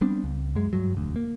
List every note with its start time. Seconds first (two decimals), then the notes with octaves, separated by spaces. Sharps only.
0.01 G3 B3 C4 D4
0.24 C#2
0.55 F#2 G#3
0.73 G2 F#3
0.93 E1 D2
1.16 A#3